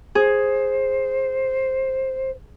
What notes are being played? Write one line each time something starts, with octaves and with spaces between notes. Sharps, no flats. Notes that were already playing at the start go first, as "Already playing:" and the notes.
G#4 C5